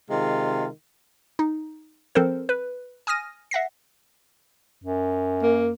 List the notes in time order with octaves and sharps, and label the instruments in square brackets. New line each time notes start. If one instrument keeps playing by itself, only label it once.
[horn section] C3 D#3 G#3 F4
[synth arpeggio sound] D#4
F3 C4 A4 A#4 C5
B4
G#5 D#6 F6 A#6 D#7
E5 F#5 A#6 C7
[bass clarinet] F#2
[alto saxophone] A#3